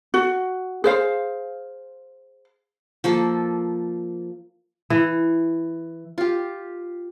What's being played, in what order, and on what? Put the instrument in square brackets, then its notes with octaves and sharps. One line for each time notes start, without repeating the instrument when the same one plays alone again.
[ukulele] F#4
G#4 C5 F5
[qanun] F3 A#3 A4
[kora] E3
[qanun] F4 G4